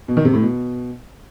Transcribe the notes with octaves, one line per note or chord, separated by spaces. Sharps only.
B2
D#3
C3
A2
B2